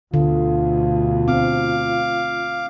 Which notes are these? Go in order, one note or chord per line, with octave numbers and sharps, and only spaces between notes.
D2 B2 D3 F4
C4 F5 D6